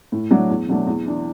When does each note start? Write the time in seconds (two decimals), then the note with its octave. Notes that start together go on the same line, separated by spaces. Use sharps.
0.12 A2
0.31 F#3 A3 D4
0.49 E2
0.67 B2 F#3 A3 D4
0.87 E2
1.06 E3 D4